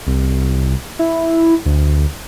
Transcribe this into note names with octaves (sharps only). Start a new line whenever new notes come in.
C2
E4
D2